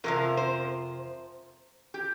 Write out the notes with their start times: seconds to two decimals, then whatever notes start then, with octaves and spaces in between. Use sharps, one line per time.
0.04 F2 C3 F3 A#4
0.37 C5
1.94 G4